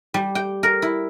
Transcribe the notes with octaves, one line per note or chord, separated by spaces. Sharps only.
G3
G5
A#4
E4